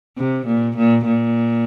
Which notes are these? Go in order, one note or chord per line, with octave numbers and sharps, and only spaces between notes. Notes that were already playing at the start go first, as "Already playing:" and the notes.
C3
A#2
A#2
A#2